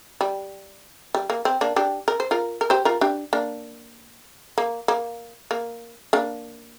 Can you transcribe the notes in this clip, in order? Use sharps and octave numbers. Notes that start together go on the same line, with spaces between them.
G3
G3
A#3
C4
A#3 D4
D4 G4
A#4
C5
F4 A#4
A#4
G4 C5
F4 A#4
D4 G4
A#3 D4
A#3
A#3
A#3
A#3 D4